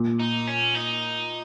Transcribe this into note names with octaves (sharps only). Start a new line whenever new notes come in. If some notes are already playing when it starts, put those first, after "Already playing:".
Already playing: A#2
D#4
C#4
D#4